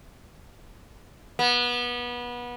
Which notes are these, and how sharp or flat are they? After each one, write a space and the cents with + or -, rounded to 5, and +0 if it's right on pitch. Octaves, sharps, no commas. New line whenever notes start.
B3 -25